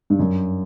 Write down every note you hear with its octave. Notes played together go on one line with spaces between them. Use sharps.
G2
F#2